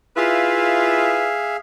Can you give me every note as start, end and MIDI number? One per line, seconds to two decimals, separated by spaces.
0.17 1.34 64
0.17 1.34 65
0.17 1.57 68
0.17 1.34 71
0.17 1.57 76
0.17 1.57 77